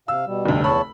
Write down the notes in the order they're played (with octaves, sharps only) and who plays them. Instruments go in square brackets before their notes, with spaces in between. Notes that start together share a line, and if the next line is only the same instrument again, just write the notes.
[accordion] C3 F5 [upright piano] E6
[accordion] B2 G3
[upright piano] F1 D2
[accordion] E2 C#5 A5 [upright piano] B5